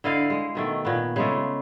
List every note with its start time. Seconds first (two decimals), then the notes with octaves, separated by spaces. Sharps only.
0.04 D3 E4 D#5 F5
0.30 G#3
0.55 B2 D#3 A3
0.85 A#2 B3
1.16 C#3 G#3 A3